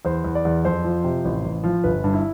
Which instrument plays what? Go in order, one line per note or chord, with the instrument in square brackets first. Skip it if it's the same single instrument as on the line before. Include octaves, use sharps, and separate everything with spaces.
[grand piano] E2 C5
E2
D5
E2
F2 C5
F3
C3
A1
A1
F3
G1 B4
G2
E4